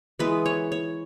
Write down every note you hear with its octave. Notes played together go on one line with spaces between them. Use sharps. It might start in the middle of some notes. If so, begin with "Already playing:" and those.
E3 G#3 B3 B4
C#5
C#5